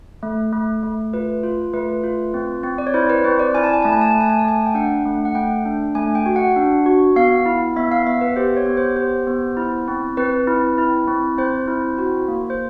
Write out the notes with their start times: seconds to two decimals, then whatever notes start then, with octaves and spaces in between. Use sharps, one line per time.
0.23 A3
0.53 A3
0.83 A3
1.13 F4 B4
1.44 F4
1.73 A3 B4
2.04 F4
2.34 C4
2.63 C4
2.78 D5
2.87 C#5
2.94 E4 C5
3.10 B4
3.24 C4 C5
3.39 D5
3.54 E4 G#5
3.64 A5
3.74 G#5
3.82 A3 A5
3.92 G#5
4.01 A5
4.11 A3 G#5
4.21 A5
4.30 G#5
4.39 A5
4.45 A3 G#5
4.66 G5
4.75 D4 F#5
5.05 A3
5.25 F#5
5.35 A3 G5
5.65 D4
5.95 A3 G#5
6.15 G5
6.26 F#4
6.36 F#5
6.56 D4
6.86 F#4
7.16 B3 F5
7.46 E4
7.76 B3 E5
7.92 F5
8.06 B3 E5
8.21 B4
8.36 G4 C5
8.57 C#5
8.66 B3
8.77 C5
8.96 G4 C5
9.27 B3
9.57 E4
9.88 C4
10.17 C4 B4
10.47 E4
10.78 E4
11.08 C4
11.38 C4 C5
11.68 E4
11.98 F#4
12.28 A#3
12.50 C5